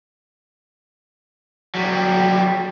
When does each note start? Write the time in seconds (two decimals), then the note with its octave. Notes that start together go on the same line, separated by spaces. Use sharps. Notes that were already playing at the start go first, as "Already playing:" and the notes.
1.75 F#3 G3